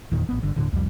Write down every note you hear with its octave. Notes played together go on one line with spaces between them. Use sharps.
F#1 E2 A#2 D#3
A1 B3
G1 D3
D#1 A2 D3
C2 F2 G3